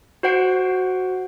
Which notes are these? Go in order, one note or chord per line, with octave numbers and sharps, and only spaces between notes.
F#4 C5 F#5 C7 D7